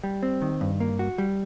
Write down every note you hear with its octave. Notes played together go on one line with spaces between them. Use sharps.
G3
C4
D#3
G2
A#3
F#4
G3